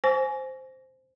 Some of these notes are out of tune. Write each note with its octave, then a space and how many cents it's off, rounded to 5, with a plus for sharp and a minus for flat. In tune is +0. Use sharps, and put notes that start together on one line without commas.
C5 +0 G#5 +15 C#6 +40